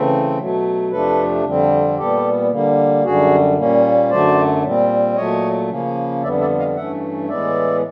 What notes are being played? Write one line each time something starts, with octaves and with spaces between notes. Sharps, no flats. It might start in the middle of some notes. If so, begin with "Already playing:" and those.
Already playing: C#3 E3 A3 C4
B2 F#3 A3
F2 C3 F3 A3 D4 A4 B4
F2 D3 G3 C4
A#2 G3 B3 G4 A4
D3 G3 A#3
F#2 D3 G3 F#4 G#4
A#2 G3 A#3 C#4
F#2 D3 F#3 A3 C5 D5
A#2 G3 C4
A#2 F#3 A3 C#5 D#5
C#3 F3 A#3 C#4
F2 D3 G3 B3 D5 E5
D5 E5
D#5 F5
G2 E3 A3 C#4 E5 F#5
A2 E3 G#3 B3 D5 E5